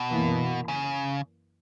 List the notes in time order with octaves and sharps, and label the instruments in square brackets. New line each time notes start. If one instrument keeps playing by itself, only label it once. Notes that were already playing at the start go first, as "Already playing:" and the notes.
Already playing: [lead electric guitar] B2
[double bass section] F#2 E3 A#3
[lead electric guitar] C#3